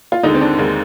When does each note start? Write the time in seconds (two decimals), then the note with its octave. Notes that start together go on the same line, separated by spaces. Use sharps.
0.12 F4
0.23 D#2 D3 G#3 D#4
0.34 C4
0.41 D4
0.58 D#2 D3 G#3